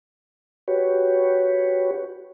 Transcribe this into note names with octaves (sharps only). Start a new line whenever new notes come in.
F#4 G4 B4 C#5